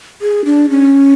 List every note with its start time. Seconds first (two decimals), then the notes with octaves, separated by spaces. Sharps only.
0.21 G#4
0.45 D4
0.70 C#4